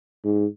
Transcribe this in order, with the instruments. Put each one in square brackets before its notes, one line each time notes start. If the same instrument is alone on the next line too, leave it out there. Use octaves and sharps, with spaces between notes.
[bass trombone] G#2